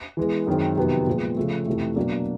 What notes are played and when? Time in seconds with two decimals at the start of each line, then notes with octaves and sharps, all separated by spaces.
0.17 E3 G#3 B3
0.47 F#2 D#3 G#3 C4
0.77 F2 C3 D#3 F#3 B3
1.07 A#2 F3 G#3 B3
1.36 C#3 F3 A3
1.66 F2 C3 E3 A3
1.96 B2 F#3 A#3 D4